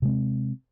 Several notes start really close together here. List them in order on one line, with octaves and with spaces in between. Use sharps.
C3 G#3 C4